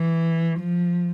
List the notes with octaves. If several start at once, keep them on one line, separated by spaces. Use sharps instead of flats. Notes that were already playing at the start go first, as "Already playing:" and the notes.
Already playing: E3
F3